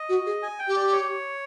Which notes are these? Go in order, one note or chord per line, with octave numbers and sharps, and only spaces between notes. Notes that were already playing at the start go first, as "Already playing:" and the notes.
Already playing: D#5
F#4
G#4
G#5
G5
G4
D5
C#5